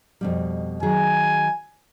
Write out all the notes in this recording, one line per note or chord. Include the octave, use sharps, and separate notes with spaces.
F2 B2 G3
D#3 F#3 G#4 G#5